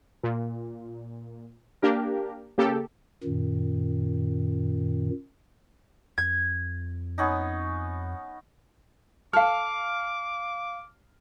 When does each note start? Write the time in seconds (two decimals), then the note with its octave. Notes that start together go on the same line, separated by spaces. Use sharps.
0.23 A#2
1.82 A#3 D4 G4 A#4
2.58 C#3 A#3 G4 A4
3.23 F#2 A#2 D#3
6.18 F2 G#6
7.18 B3 C#4 D#4
9.33 A4 F5 D6 F6